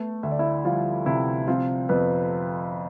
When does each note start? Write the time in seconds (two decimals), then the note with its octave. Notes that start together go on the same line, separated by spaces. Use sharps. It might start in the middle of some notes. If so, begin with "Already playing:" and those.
Already playing: A3 B3 A4
0.23 D2 E5
0.31 D5
0.39 E4 E5
0.65 F3 G3 F4
1.06 C3 E4
1.48 F3 C4 F4
1.89 F2 B3 B4